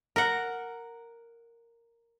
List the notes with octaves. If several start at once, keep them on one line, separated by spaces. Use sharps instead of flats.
A#4 F#5